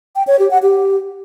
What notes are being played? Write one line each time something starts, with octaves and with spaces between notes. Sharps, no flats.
G5
C#5
G4
F#5
G4